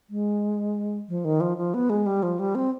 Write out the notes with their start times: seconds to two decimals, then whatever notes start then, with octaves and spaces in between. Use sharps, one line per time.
0.10 G#3
1.09 F3
1.25 D#3
1.41 F3
1.58 F3
1.74 B3
1.90 G#3
2.06 G3
2.23 F3
2.39 G3
2.55 C4